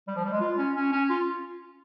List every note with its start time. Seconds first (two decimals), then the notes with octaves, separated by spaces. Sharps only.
0.08 G3
0.16 F3
0.25 G3
0.32 G#3
0.41 F4
0.58 C#4
0.75 C#4
0.92 C#4
1.10 F4